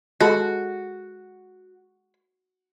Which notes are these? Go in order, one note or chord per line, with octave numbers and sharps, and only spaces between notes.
G#3 F#4 A4 B5